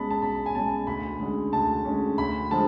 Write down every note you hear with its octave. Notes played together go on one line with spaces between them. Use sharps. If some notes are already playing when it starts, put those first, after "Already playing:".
Already playing: B1 B2 G#3 C#4 A5 B5
A5
B1 B5
G#5
B2 G#3 C#4 A5
D2 B5
D3 G#3 C#4
D2 A5
D3 G#3 C#4
D2 B5
D3 F3 G#3 A5